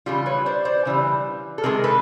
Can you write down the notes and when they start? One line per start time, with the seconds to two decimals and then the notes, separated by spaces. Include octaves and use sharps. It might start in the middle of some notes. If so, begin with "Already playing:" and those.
0.06 C#3 E3 G3 F4 G4
0.26 B4 C#5
0.46 C5 D5
0.65 C5 D5
0.85 C#3 E3 G3
1.58 A4
1.63 C3 D#3 G#3 G#4 A#4
1.84 A4 B4